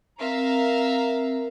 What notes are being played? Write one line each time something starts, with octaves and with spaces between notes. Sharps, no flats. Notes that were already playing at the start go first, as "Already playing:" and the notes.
C4 A#4 E5 F5 A#5